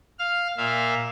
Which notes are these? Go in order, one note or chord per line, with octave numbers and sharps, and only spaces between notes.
F5 F6
A#2 E5 F5